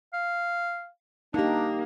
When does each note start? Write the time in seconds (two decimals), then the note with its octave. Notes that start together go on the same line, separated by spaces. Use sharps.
0.13 F5
1.34 A#3 D4 D#4 G4